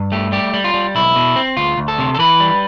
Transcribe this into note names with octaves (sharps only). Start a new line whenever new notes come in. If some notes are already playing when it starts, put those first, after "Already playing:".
Already playing: G2
A3 G4
G3 G4
G3
F4
G3
B1 E4
B2
C4
D2 F4
D2
A4
C3
A4
E3 B4
G3